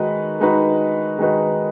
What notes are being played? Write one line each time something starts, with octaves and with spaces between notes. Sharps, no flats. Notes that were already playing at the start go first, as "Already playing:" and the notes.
Already playing: D#3 G#3 D#4 F#4 B4
D#3 G#3 D#4 F#4 B4
D#3 G#3 D#4 F#4 B4